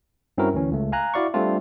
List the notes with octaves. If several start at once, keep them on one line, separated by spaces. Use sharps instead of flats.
G2 C4 C#4 E4 F#4 A#4
D2 E3 C#4
C#2 A3
F5 G#5 A#5 F#6
E4 F#4 D5 F5 C#6
G3 A3 C4 D4 F4